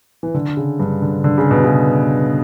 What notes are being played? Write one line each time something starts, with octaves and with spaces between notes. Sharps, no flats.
E3
D3
C#3
G2
D3
D3
C#3
B2
C#3